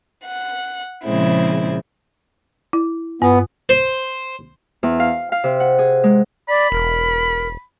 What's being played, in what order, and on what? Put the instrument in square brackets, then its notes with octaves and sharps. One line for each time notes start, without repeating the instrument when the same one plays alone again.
[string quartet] F#5
A#2 C#3 F3 G#3 C4 E4
[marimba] E4
[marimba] G2 [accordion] B3
[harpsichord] C5
[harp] E2
F5
F5
C3
F#5
G#4
G#3
[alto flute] D5 [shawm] B5
[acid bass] E1 [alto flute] A#4